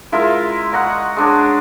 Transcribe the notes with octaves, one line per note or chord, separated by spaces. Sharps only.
G#3 E4 F4 A#4
D#5 F#5 A#5 C#6
G#3 D4 C#5